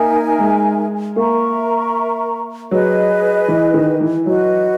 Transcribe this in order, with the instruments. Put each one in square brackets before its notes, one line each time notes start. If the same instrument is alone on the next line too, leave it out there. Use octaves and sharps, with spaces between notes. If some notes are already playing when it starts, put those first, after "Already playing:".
Already playing: [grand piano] A#3 [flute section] D#4 A#4 E5 G#5
[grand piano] G#3
[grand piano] A#3 [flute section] A#4 E5 A#5 C#6
[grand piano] F#3 [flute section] G#4 B4 D#5
[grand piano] E3
D#3
E3
[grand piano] F#3 [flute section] F#4 B4 D#5